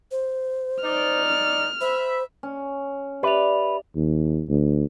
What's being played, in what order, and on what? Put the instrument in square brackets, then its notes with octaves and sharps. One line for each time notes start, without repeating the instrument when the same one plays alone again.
[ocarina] C5
[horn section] D#4 D5 [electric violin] F6
[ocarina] C5 [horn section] E5 B5
[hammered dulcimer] C#4
[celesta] G4 E5 F7 [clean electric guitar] B4 [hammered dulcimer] D5
[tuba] D#2
D2